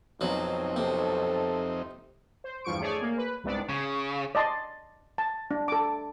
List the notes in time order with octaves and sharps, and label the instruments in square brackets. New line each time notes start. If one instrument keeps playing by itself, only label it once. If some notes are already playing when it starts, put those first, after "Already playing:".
[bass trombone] B1 [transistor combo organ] F2 C4 D#4 [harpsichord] F#3
[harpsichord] C3 [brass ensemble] A4
[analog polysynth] C5
E2 G2 F3 C#6 D7
A3 G#4 C#5 D5 G#5
A#3
B4
C2 G#2 C3 B3 D4 D5
[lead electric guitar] C#3
[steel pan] D5 D#5 A5 C6
A5
D4
A4 D6